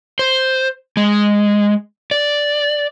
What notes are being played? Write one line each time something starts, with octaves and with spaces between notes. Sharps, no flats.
C5
G#3
D5